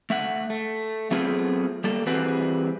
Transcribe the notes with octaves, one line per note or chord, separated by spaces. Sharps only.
A3 E5 F#5
A3
F#3 A3 B3 C4 F4 G#4
G3 A#3 A4
E3 G3 C4 F#4 G#4 B4